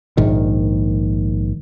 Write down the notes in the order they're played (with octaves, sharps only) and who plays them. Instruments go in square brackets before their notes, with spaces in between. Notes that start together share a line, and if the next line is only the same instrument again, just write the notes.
[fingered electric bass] A#1 G#2 D#3